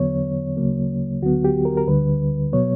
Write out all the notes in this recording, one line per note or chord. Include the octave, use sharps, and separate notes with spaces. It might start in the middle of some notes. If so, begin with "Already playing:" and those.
Already playing: E2 D3 F#3 B3 C#5
D2 C#3 F#3 A#3
D2 D3 F#3 B3 F#4
G4
A#4
A#4
D2 D3 G3 B4
B2 F#3 B3 C#5